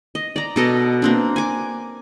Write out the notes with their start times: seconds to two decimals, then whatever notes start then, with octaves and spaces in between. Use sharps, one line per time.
0.15 D#5
0.36 D5 A#5
0.56 B2 A4 D#5
1.02 A#3 C4 D4
1.36 G#5 D6